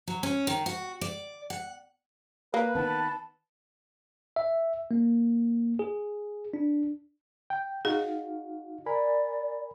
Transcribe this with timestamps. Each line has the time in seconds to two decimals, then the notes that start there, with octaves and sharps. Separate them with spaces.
0.08 F#3
0.23 C#4
0.47 D#3
0.66 F#4
1.01 D5
1.50 F#5
2.54 A#3 B4
2.75 D#3 B3 A5
4.36 E5
4.91 A#3
5.79 G#4
6.54 D4
7.50 G5
7.85 D#4 F#4 G#4 F5
8.86 A#4 D5 G#5 B5